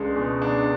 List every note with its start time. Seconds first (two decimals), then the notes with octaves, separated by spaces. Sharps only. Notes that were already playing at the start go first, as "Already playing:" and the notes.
Already playing: C#2 G#3 D4
0.16 B2
0.42 D4